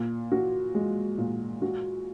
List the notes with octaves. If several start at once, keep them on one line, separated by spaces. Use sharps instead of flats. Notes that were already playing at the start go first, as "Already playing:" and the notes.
Already playing: A#2
F#4
G#3
A#2
F#4